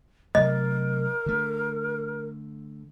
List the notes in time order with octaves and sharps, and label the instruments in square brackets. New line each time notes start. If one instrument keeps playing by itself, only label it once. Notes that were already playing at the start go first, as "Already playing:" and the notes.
[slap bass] C3 F#3 A3 [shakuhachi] A#4 [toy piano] D#5
[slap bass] D3 A3